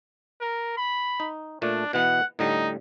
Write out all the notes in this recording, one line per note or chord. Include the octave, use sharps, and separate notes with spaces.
A#4
B5
D#4
A#2 A3 D4
B2 E3 B3 F#5
A2 D3 G3 D#4